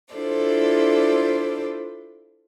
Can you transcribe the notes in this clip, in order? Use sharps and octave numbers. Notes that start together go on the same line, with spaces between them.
D4 E4 F4 A4 C5 D5